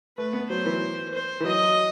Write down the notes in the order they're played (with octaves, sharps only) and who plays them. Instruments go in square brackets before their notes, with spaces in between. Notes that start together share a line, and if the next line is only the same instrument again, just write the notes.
[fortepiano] A3 [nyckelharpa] B4
[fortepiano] B3
[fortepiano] F#3 [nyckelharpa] C5
[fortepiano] E3
[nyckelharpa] C5
[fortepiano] E3
[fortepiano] F#3 [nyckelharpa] D#5